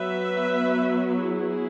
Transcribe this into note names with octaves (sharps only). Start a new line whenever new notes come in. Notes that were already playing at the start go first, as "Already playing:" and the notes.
Already playing: F#3 B3 B4 E5
E4 G#4